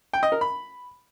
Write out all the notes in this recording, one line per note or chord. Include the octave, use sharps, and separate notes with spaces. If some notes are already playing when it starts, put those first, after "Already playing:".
G5
D#5
A#4
B5